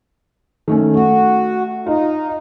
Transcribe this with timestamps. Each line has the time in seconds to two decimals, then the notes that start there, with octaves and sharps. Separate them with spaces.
0.68 D#3 A3 C#4
0.94 A3 F#4
1.87 D#4 F4